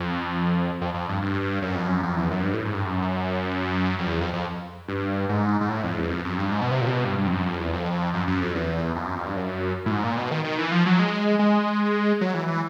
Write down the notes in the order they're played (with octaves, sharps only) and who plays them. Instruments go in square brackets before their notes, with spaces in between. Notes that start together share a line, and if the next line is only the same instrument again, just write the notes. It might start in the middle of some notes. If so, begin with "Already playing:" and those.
Already playing: [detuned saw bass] F2
F2
F2
G2
G2
F#2
F2
F#2
F2
E2
F#2
G2
A2
G#2
G2
F#2
F2
E2
F2
F2
G2
G#2
G#2
A2
F2
E2
F2
F#2
G2
G#2
B2
C3
A#2
C3
B2
G2
G2
F2
F#2
F2
E2
F2
F#2
F#2
F2
E2
F2
F#2
F2
G2
F#2
A2
G#2
A#2
B2
D#3
D#3
E3
F3
F#3
G#3
G#3
F#3
E3
E3